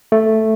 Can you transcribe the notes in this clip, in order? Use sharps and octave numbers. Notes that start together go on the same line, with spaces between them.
A3